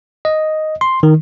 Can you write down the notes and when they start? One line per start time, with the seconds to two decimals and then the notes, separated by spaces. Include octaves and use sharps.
0.25 D#5
0.81 C6
1.03 D#3